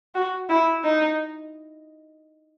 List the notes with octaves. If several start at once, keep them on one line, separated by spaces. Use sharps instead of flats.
F#4
E4
D#4